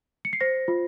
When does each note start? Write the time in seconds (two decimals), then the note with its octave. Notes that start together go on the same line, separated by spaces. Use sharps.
0.25 C#7
0.33 C7
0.41 C5 A#6
0.68 F4